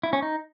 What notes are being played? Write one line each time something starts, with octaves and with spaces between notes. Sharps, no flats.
E4
C#4
D#4